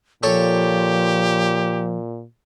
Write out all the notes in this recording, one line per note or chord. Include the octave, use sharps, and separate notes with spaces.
A#2 F3 G4 A4 C#5